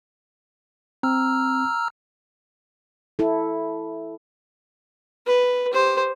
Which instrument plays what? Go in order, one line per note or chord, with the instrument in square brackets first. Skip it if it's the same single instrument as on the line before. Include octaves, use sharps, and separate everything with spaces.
[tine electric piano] C4 [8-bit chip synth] A#5 E6 F6
[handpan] E4 A4
[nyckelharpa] B4
G4 C5